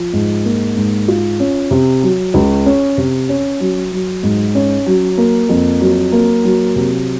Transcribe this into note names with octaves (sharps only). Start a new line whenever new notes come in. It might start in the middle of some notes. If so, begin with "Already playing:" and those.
Already playing: F3
G#2
A#3
G#2
F4
C#4
C3
F#3
C#2
C#4
C3
C#4
F#3
F#3
G#2
C#4
F#3
A#3
F2
F#3
A#3
F#3
C3